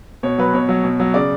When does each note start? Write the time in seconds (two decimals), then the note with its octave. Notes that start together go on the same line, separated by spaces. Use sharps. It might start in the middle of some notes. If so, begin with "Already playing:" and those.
0.23 B2 C#5
0.38 F#3 B4
0.54 B2 C#5
0.69 F#3
0.84 B2
1.00 F#3
1.14 C#3 D5